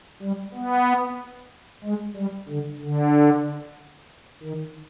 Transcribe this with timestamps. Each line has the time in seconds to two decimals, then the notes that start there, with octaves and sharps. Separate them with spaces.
0.22 G3
0.54 B3
1.84 G#3
2.17 G3
2.49 D3
2.81 D3
4.43 D#3